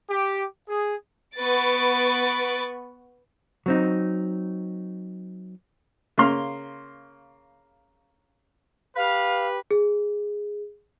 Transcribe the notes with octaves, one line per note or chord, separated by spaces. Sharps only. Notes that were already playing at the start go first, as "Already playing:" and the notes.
G4
G#4
B3 B4 C#6 A6 D7
F#3 C4 D#4
C#3 A#3 C6 F6
G4 B4 F5
G#4